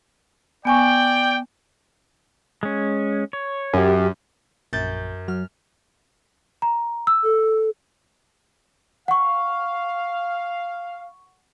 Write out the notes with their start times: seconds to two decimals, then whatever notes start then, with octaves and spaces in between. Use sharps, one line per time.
0.65 B3 D5 G5 G#5 C#6
2.63 G#3 C#4
3.33 C#5
3.73 F#2 C#4 G4
4.73 A#1 F#2 G6 A6
5.28 F#3 F6
6.62 A#5
7.07 E6
7.24 A4
9.08 F5 F#5 C#6